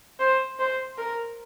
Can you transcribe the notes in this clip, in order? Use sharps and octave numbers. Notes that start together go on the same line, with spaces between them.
C5
C5
A#4